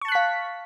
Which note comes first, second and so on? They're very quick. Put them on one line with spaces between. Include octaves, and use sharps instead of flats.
C#6 A5 F#6 B6 F5